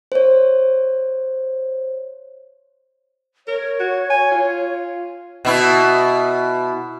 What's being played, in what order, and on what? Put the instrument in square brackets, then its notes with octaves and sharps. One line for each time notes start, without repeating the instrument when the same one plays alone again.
[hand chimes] C5 C#5
[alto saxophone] A#4 [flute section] C#5
[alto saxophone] F#4
G#5
F4
[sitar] B2 E4